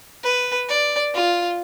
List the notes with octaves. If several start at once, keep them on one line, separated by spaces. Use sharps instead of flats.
B4
D5
F4